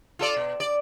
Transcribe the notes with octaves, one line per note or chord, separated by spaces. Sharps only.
F4 A4 D5
B2
D5